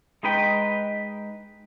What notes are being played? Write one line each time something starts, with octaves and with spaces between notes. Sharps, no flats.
G#3 D#4 B4 G5